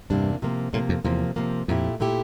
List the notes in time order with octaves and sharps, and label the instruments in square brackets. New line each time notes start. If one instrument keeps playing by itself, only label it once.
[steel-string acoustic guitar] E2 C3 E3 A#3 D4 [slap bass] G2
[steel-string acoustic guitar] C3 F3 A#3
[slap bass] A2 [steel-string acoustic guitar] C3 F3 A#3
[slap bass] F2
[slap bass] E2 [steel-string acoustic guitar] C3 F3 A#3
[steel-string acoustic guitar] C3 F3 A#3
[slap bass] F2 [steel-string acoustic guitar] A#2 A3 E4 G4
[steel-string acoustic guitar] A#2 A3 E4 G4